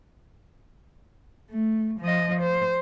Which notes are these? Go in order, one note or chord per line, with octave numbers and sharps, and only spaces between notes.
A3
F3 D#5
C5